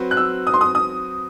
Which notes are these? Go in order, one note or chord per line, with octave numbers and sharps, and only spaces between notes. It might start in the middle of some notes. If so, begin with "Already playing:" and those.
Already playing: F#3 C4 F#4 B4
F#6
E6
D#6
C6
D#6
D#6